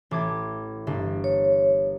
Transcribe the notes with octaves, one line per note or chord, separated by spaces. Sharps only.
A1 D6 G#6
G1
C#5